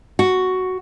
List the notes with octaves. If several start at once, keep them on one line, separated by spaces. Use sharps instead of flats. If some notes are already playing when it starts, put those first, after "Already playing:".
F#4